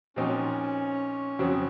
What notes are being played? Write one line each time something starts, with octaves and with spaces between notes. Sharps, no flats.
A#2 F3 C4 C#4 D#4 F#4
F2 C#3 F#3 C4 F#4